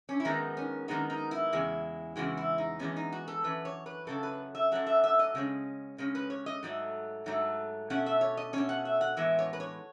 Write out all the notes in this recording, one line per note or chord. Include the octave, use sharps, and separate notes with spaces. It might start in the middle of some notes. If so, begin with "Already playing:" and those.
C#4
E4
F#2 D#3 G#3 B3 D#4
C#4
F#2 D#3 G#3 B3 D#4
D#4
E4
E2 C#3 G#3
E2 C#3 E3 G#3 F#4
E4
D#4
F#2 E3 G#3 B3 C#4
D#4
F#4
A4
F#2 E3 B4
C#5
B4
F#2 C#3 F#3 A3 A4
B4
E5
F#2 C#3 F#3 A3 F#5
E5
E5
D#5
C#3 G#3 C#4
C#3 G#3 C#4
B4
C#5
D#5
G#2 F#3 A3
G#2 F#3 A3
B2 A3 C#4 F#5
E5
C#5
D#5
B2 A3 C#4 C#5
F#5
E5
F#5
A2 E3 G#3 B3 E5
C#5
B4
C#5